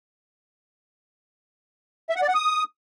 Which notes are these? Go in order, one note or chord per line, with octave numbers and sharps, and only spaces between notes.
E5
F#5
D5
F#5
D#6